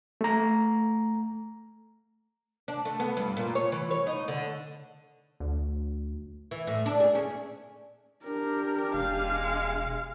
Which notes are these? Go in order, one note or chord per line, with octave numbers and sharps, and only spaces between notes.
A3 A#5
D4
A3
B3
G2
A#2
C#5
E3
C#5
D#4
D3
D2
E3
A2
D4
G#4
C#4
D4 G4 A#4
E1 G#3 F5